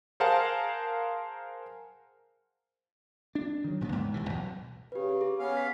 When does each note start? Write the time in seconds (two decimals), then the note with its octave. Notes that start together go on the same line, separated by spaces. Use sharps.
0.20 G#4 A#4 C5 F5 F#5 A5
3.35 D4
3.64 D#3 F#3
3.81 E1 A#2 D3 B3
3.92 C#2 G#2
4.14 E1 C3 E3
4.29 B1 B2
4.92 C#3 G4 B4
5.21 G#4
5.39 B3 C#4 F5
5.57 B6